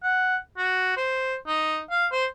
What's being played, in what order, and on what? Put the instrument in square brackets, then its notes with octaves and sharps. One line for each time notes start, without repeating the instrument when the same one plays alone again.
[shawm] F#5
F#4
C5
D#4
F5
C5